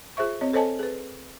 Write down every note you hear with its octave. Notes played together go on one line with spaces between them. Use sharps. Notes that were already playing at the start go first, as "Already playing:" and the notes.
F4 G#4 C5 E5 C#6
C4 C#5 D#5
A4 C5 C#5 D#5 G#5 A5
G#4 B4